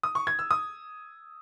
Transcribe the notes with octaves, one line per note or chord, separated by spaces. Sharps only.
D#6
C#6
G#6
E6
D#6